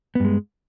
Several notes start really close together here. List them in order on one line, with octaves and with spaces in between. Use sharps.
B3 G2 G#3